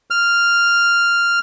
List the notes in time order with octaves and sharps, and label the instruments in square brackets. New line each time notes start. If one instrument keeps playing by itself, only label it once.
[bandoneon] F6